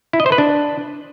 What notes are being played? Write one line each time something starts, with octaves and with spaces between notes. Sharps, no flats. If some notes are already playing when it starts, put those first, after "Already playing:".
E4
D#5
C5
B4
D4